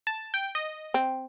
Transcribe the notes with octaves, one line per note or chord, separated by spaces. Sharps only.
A5
G5
D#5
C4